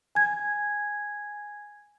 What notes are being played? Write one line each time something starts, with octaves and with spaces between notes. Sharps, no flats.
G#5 G#6